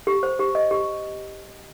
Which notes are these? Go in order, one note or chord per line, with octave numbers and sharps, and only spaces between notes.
G4
C5
G4
D#5
G4